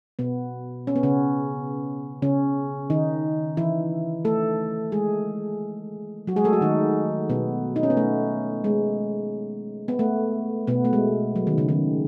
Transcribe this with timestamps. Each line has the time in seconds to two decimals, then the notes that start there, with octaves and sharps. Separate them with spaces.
0.19 B2 B3
0.87 C#4
0.96 B3
1.03 C#3 C#4
2.22 C#3 C#4
2.90 D#3 D#4
3.57 E3 E4
4.25 A3 A4
4.92 G#3 G#4
6.27 F#3 F#4
6.36 G#3 G#4
6.44 A3 A4
6.53 F#3 F#4
6.61 D#3 D#4
7.30 B2 B3
7.76 D#4
7.83 C#4
7.90 B3
7.97 A3
8.64 G#3
9.88 B3
9.99 A3
10.67 B2 B3
10.85 A3
10.93 G#3
11.36 F#3
11.47 D#3
11.58 C#3
11.69 D#3